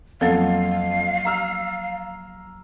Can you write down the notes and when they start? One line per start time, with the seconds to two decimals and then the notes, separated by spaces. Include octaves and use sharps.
0.21 F2 F3 F#3 A#3 A4 F5
1.25 A#5 E6 F6